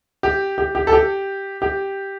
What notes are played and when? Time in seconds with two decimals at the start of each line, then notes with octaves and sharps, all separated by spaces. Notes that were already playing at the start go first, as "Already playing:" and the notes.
0.23 G4
0.58 G4
0.75 G4
0.87 A4
0.93 G4
1.62 G4